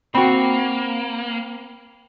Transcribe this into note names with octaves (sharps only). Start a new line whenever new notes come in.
A#3 C4 F#4 G5 B5